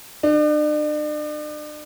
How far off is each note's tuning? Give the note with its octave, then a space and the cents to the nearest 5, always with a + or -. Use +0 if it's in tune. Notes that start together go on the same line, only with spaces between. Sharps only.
D4 +40